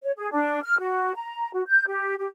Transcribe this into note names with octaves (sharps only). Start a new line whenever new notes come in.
C#5
G#4
D4
F6
F#4
A#5
F#4
G6
G4
G4